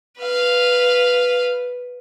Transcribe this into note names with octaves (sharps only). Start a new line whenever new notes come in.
B4 F5